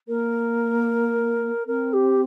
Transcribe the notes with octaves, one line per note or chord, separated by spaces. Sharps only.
A#3 A#4
C4 A#4
G4